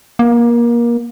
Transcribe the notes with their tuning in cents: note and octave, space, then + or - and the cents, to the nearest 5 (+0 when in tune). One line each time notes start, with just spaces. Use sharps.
A#3 +25